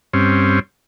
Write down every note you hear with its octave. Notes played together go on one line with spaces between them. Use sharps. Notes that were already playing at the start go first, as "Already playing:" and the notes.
G2 C4 C#4